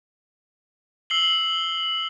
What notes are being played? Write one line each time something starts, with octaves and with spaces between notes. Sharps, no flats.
E6 C7 F#7 G7